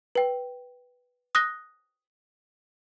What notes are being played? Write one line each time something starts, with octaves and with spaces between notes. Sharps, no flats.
B4 G5
D#6 F#6 A#6 G7